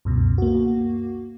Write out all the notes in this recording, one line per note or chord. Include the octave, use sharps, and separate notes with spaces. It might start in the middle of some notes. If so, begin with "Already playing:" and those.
C#2 F#2 B2
A#3 F#4